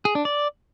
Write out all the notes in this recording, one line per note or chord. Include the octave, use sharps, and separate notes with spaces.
G#4
D4
D5